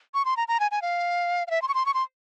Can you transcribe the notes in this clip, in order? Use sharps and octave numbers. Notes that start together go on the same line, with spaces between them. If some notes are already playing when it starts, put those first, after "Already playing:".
C#6
C6
A#5
A#5
G#5
G#5
F5
F5
E5
C6
C#6
C6
C#6
C6